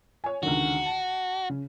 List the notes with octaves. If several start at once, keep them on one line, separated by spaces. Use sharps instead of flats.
C#5 G#5
C#2 D3 D#3 F#4
A5
C#3